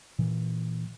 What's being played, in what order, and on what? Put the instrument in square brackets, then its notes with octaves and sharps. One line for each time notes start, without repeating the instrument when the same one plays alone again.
[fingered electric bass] A#2 E3